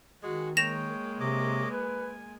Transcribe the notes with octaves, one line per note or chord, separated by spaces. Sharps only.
D#3 G#3 F#4 G#4
G#3 A#3 C#5 G5 A#6 E7 F7
C3 C#5 D#5 D6
B4 G#5